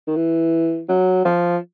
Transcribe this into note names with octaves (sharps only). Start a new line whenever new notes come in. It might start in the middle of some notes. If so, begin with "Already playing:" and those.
D#3
E3
F#3
F3